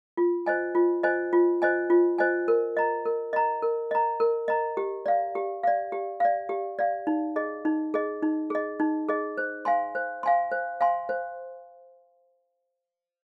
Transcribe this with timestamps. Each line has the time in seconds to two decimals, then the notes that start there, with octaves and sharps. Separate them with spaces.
0.17 F4
0.46 C5 D#5 G#5
0.75 F4
1.03 C5 D#5 G#5
1.33 F4
1.62 C5 D#5 G#5
1.90 F4
2.18 C5 D#5 G#5
2.48 A#4
2.77 D#5 A#5
3.05 A#4
3.33 D#5 A#5
3.63 A#4
3.91 D#5 A#5
4.20 A#4
4.48 D#5 A#5
4.77 G4
5.06 D5 F5
5.35 G4
5.63 D5 F5
5.92 G4
6.20 D5 F5
6.49 G4
6.79 D5 F5
7.07 D#4
7.36 G#4 D#5
7.65 D#4
7.94 G#4 D#5
8.23 D#4
8.50 G#4 D#5
8.80 D#4
9.09 G#4 D#5
9.38 C5
9.65 F5 G#5 C6
9.95 C5
10.23 F5 G#5 C6
10.52 C5
10.81 F5 G#5 C6
11.09 C5